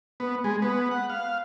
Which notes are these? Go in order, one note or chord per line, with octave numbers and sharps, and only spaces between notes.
B3
G#3
B3
F#5
F5